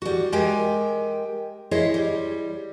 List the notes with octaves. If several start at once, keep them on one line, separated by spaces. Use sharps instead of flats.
G3 F#4
G#3 G4 A#4 G5 G#5
E4 G#4 C5 C#5 D#5
G3